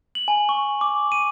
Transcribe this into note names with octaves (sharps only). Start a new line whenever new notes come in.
F#7
G#5
C#6
D6
D#7